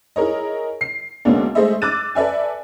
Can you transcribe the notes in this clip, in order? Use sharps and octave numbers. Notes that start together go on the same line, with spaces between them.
E4 G#4 A#4 C#5 D#5
C7
D2 G#3 A#3 B3 C#4 D4
G#3 A3 G#4 C5 D#5 E5
D6 E6 F#6 A6 D#7
A4 B4 D5 E5 G#5